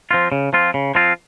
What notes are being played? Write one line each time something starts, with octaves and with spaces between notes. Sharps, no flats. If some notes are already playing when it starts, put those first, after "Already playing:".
F3 C4 F4
C#3
F3 C4 F4
C#3
F3 C4 F4